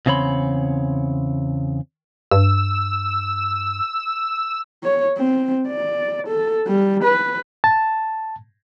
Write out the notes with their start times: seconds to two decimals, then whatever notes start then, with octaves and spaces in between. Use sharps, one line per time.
0.06 E2 C#3 C4 C#5 B5 C6
2.31 G2 E6
4.84 C#5
5.18 C4
5.68 D5
6.27 A4
6.67 G3
7.04 B4
7.64 A5